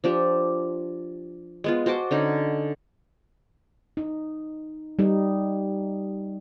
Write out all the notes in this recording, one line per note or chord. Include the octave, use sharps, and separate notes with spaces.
F3 D4 G4
G#3 B3 F4
F#4 C5 A5 D6
D3 C#4 D#4
D#4
G3 D#4